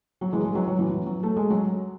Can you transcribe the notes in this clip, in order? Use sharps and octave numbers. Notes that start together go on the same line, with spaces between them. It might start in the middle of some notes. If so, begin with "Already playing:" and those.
F#3
E3 G#3
E3 G#3
F#3
F#3
E3
E3
F#3
A3
G#3
F#3